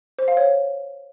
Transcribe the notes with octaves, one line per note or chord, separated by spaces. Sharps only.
C5
F5
C#5